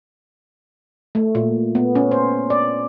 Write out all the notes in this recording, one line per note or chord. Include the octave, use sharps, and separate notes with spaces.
A3
A#2
B3
C#4
C5
D5